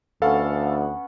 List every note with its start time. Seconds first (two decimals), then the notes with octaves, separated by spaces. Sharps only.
0.22 D2 B3 C#4 A4 F5 F#5